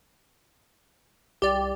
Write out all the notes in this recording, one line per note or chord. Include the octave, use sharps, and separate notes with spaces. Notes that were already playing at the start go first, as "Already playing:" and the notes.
C2 G4 D5